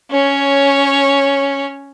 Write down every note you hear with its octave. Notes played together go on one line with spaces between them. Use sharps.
C#4 C#5